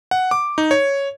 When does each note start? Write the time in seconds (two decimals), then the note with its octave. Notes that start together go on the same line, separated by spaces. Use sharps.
0.11 F#5
0.31 D6
0.58 D#4
0.71 C#5